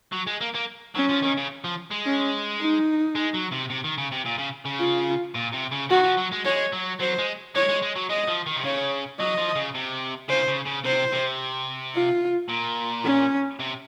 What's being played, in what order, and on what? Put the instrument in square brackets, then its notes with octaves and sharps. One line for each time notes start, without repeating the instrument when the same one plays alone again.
[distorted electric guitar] F#3
G#3
A#3
A#3
[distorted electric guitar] F#3 [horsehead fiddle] C#4
[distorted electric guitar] F3
D#3
C#3
F3
G#3
[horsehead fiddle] C#4
D#4
[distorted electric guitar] G#3
F#3
C3
C3
D#3
C#3
C3
A#2
C#3
C#3
[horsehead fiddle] F4
[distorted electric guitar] A#2
C3
C#3
[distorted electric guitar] D#3 [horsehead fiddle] F#4
[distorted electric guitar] F3
F#3
G#3
[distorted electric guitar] G#3 [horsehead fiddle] C#5
[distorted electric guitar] F#3
[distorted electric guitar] F#3 [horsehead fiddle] C5
[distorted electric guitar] G#3
[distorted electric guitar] G#3 [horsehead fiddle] C#5
[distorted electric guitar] G#3
G#3
F#3
[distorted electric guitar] G#3 [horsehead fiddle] D#5
[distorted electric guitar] F3
D#3
C3
[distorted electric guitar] C#3 [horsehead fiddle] C#5
[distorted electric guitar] F#3 [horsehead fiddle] D#5
[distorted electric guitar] F3
C#3
C3
[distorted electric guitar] C#3 [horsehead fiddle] C5
[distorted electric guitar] C#3
C#3
[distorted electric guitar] C3 [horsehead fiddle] C5
[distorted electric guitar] C3
[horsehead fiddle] F4
[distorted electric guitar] A#2
[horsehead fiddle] C#4
[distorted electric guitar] C3